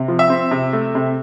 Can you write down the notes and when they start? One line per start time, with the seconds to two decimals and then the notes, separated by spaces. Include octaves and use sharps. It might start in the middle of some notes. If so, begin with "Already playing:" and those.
Already playing: C3
0.08 F3
0.19 E5
0.30 C4
0.51 C3
0.73 A3
0.95 C3